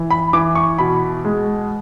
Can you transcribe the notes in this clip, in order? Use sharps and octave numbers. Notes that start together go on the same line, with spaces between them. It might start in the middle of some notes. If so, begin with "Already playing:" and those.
Already playing: E3
B5
E3 D6
C#6
B2 B5
G#3